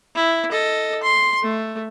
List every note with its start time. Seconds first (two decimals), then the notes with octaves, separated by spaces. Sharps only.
0.15 E4
0.52 A4 D#5
1.03 C6
1.43 A3